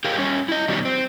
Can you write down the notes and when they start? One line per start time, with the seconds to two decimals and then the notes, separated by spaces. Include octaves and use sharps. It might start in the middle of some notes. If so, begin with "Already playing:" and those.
0.04 G4 G#4 A#4 F5 G5
0.17 G3 C#4 C#5
0.48 E4 D#5
0.68 B2 D#3 F#3 G3
0.85 C4